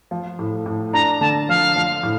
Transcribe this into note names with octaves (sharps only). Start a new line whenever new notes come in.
F3
A2
A2
D4 A#5
D3 A5
F3 F5
F3
A2